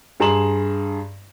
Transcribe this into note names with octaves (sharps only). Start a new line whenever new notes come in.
G2 G#4 A#5 C6 E7 F#7